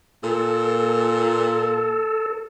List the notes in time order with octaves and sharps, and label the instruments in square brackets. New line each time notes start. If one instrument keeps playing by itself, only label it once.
[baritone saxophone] A#2 [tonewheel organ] A4